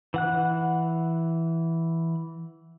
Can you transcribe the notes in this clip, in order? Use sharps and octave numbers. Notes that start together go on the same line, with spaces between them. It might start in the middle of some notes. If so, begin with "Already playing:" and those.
E3 F#5 F#6